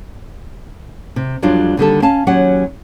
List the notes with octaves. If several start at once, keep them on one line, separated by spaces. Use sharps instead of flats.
C3
F2 F#3 G3 D4 F4
D#2 D3 G3 A4
C#4 F5 A5
D#2 F#3 C#4 G4 F#5